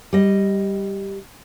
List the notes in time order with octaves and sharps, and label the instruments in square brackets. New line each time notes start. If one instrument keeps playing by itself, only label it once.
[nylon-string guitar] G3 D#5